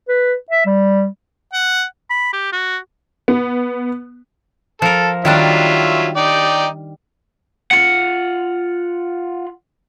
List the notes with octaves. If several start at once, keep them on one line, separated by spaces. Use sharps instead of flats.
B4
E5
G3
F#5
B5
G4
F#4
B3
F3 A4 A#4
D#3 F#3 G3 D4 F4 E5
D#4 D5 G5
F4 F#5